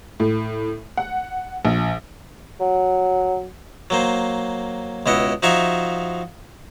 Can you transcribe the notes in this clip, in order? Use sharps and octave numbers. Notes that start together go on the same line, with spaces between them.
A2
F#5
A#1
F#3
F#3 A#3 C5
C#2 B2 E4 D#5 F#5
F3 D#4 F#4 E5 F5 G#5